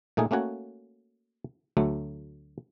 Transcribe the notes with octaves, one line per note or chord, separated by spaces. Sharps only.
A#2 A3 D#4 G#4
A3 A#3 C#4 F#4 C#5
D2 F#3 A3